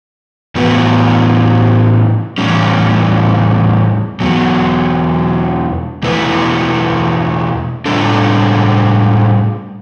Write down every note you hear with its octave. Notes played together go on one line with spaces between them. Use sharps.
A2 E3 B3 F#4 B4
A2 E3 G3 C#4
E2 B2 F#3
E2 B2 A3 E4 B4
A2 G3 D4 A4